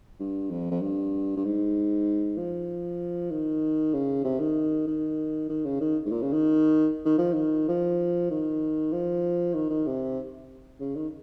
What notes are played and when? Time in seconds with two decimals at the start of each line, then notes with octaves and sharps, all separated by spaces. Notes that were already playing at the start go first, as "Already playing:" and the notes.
0.20 G2
0.50 F2
0.71 F2
0.81 G2
1.36 G2
1.44 G#2
2.38 F3
3.30 D#3
3.94 C#3
4.24 C3
4.40 D#3
4.87 D#3
5.49 D#3
5.65 C#3
5.80 D#3
6.06 G#2
6.11 A#2
6.22 C#3
6.32 D#3
7.05 D#3
7.18 F3
7.33 D#3
7.68 F3
8.30 D#3
8.92 F3
9.54 D#3
9.70 D#3
9.86 C3
10.80 C#3
10.96 D#3